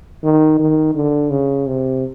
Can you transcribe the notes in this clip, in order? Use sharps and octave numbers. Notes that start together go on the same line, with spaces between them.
D#3
D#3
D3
C#3
C3